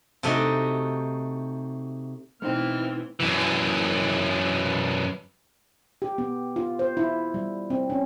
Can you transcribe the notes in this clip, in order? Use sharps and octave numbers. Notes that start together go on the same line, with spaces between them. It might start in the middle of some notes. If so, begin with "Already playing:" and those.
C3 A3 D#4 F#4
B2 E3 A3 C4 D#4 B4 F6
F#2 E3
G4
B3
F4
C5
E4
G3
C4
C#4